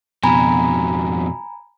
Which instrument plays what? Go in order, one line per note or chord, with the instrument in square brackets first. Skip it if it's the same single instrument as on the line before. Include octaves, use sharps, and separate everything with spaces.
[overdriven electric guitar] F2 B2 [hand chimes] G#5 A#5 B5